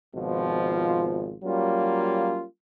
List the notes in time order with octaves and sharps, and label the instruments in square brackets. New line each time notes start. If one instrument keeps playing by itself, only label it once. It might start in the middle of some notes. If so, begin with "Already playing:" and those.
[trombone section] G#1 B2 F3 F4
F#3 G3 A#3 C#4 F4